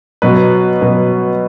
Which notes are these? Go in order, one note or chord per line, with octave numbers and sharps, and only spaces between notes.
B2 F#3 B3 B4
B2 F#3 B3